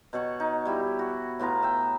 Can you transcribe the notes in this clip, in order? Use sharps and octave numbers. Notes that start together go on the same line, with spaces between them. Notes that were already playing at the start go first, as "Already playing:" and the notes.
B2 C#5 F#5 C#6
D#4
G3 E4 G4
F#4
A2 B3 F4 A#5
E5 G5